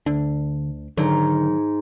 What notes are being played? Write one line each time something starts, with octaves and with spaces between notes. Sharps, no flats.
D2 D3 D4
G#2 D3 D#3 F#3